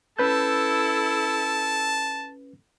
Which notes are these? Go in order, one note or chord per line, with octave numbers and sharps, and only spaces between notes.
C#4 E4 A4 B4 A5 G6